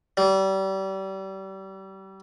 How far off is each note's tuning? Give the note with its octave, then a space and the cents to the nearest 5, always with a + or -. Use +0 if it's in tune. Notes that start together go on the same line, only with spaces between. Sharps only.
G3 -30